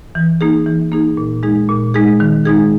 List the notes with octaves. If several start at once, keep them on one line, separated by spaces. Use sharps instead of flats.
E3
A#3 D#4 G#4
E3
A#3 D#4 G#4
A#2
G#3 D#4 G#4
A#2
G#3 D#4 G#4
D#3
G#3 D#4 G#4